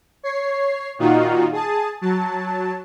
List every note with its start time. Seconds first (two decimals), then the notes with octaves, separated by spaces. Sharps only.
0.23 C#5 C7
0.99 A#2 D#3 D#4 F4 F#4
1.52 G#4 A5 D#6
2.01 F#3 A5